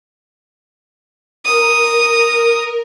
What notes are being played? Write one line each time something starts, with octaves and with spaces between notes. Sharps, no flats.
A#4 D#6